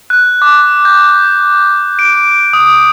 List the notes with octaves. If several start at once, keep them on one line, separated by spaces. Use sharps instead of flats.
F#6
D6
G6
D7
D#6